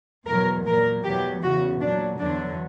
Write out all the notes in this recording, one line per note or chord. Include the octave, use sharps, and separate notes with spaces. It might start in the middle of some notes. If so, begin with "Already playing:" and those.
E2 B2 F#3 A#4
A#2 F#3 A#4
E2 B2 F#3 G4
E2 C#3 E3 F#4
A#2 F#3 D4
E2 D3 F#3 D4